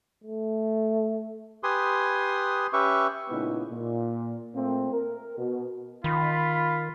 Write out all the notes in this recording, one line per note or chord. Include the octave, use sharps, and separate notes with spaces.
A3
G4 B4 G#5 C6 D#6
C#4 G4 B4 E5 C#6
A#2 C#3 G#3 B3 D#4 E4
A#2
A#2 A3 A#3 C4
A#4
B2
D#3 F4 B5